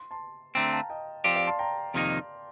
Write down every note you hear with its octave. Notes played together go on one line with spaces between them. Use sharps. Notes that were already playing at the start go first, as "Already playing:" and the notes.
Already playing: C6
A5 C6
D3 A3 C4 G5 A#5
A#5
F5 A5
D#5 G5
F3 C4 G4 D5 F5
D5 F5
A5 C6
G5 A#5
F2 C3 D#3 A#3 D#4